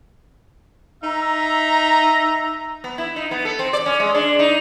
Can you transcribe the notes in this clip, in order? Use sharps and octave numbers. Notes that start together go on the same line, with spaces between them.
D#4 E5 A#5
B3
E4
D#4
B3
A4
C4
D5
C#4
G#3
D4
D#4